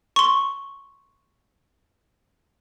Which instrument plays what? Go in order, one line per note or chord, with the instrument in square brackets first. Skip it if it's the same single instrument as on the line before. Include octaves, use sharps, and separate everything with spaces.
[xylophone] C6 C#6